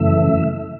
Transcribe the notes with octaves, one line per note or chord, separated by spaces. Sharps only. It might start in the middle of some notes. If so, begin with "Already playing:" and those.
Already playing: F#2 C#3 E3 A3 E5